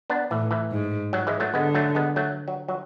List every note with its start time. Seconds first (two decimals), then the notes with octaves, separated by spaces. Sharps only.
0.10 B3 D4
0.31 A2 E3
0.51 E3
0.71 G#2
1.13 F#3
1.27 E3 G#3
1.40 F#3 A3
1.54 D3 G#3 B3
1.75 F#3 A3
1.95 G#3 B3
2.16 F#3 A3
2.48 F#3
2.68 F#3